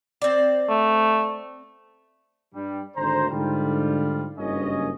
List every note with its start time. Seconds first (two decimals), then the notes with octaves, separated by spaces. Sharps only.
0.22 C4 D5
0.69 A3
2.55 G2 G3
2.96 G#1 D2 C5 A#5
3.30 G#2 D3 G3 F4
4.39 F#1 G2 C#4 D#5